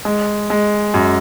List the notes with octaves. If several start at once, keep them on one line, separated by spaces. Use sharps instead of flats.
G#3
G#3
F#2